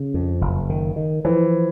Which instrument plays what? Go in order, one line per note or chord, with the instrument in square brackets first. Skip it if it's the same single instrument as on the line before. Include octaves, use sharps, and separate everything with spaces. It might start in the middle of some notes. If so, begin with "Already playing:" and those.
Already playing: [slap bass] C#3
F2
F#1
D#3
D#3
[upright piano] E3 [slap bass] F3